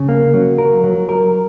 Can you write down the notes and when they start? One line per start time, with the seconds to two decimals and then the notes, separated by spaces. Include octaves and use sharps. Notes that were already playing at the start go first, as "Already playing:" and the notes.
Already playing: C#3
0.09 A#3
0.34 F#3
0.58 A#4
0.84 F#3
1.09 A#4